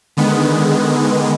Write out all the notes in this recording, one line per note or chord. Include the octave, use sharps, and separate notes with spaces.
D3 D#3 G#3 B3